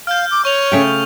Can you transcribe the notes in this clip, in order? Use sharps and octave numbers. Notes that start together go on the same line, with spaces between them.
F5 F6 G6
D6
C#5 C#6 F7
C#3 A3 G5